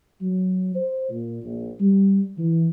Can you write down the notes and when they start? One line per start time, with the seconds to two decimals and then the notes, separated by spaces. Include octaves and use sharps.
0.21 F#3
0.75 C5
1.09 A#2
1.43 A#1
1.80 G3
2.38 E3